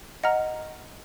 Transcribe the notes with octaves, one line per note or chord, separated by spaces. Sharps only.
D#5 F#5 A#5 F6